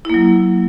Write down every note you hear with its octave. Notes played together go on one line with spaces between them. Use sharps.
F#3 A#3 E4